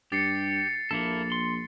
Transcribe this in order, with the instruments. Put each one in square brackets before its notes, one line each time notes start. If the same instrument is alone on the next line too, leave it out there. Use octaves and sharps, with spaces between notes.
[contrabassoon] G2 [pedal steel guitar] G4 [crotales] A6 C7 C#7
[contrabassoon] A#1 [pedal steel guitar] A#3 E4 A4
[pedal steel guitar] C6